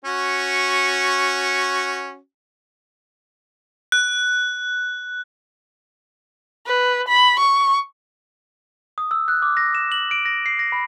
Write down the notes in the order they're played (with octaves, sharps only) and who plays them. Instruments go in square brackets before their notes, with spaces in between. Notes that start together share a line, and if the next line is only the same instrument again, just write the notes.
[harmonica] C#4 F#4
[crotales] F#6
[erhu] B4
B5
C#6
[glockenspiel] D#6
E6
F#6
D6
A#6
E7
F#7
D7
A#6
C7
A#6
B5